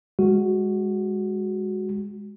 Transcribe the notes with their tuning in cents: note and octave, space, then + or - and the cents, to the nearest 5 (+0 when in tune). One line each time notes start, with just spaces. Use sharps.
G#3 -15 F#4 +0